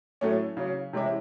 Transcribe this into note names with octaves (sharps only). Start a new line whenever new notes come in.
A2 F#3 A3 C#4
C#3 F#3 C#4
C3 E3 G#3 C#4 E4